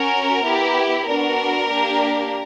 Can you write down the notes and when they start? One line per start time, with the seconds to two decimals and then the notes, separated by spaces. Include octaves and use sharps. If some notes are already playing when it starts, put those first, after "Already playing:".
Already playing: C#4 F#4 A#4
0.45 B3 E4 G4
1.07 B3 D4 F#4 A#4
1.70 A#3 D4 G4